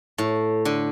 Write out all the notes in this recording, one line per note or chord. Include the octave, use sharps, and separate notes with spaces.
A2
D3